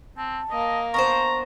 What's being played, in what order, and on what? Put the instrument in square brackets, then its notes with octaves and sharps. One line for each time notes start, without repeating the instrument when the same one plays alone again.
[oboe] C4 [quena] A5
[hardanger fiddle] A#3 [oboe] D#5
[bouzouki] B3 D4 C5 [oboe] A#5 [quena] C#6